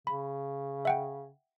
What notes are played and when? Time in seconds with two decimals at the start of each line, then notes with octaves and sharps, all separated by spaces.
0.07 C#3 B5
0.85 E5 F#5 G5